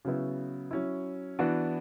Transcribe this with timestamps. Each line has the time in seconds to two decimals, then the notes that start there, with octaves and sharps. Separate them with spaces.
0.05 C#3 F#3 B3 E4
0.71 F#3 C#4 E4
1.39 E3 B3 D4 F#4